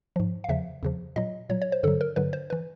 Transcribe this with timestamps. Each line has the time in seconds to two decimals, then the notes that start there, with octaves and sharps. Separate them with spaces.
0.16 G#2 F3
0.44 F5
0.49 E2 C#3 F3 E5
0.83 E2 C#3 F3
1.16 A#2 F#3 D#5
1.49 A#2 F#3 C#5
1.62 C#5
1.72 C5
1.83 G2 D3 F#3 A4
2.01 A#4
2.16 G2 D3 F#3 B4
2.33 C5
2.50 E3 B4